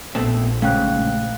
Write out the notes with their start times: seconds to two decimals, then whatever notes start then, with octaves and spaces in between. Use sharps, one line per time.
0.15 A#1 B2 A3 C4
0.62 G#2 C#3 A3 F5 G5 F#6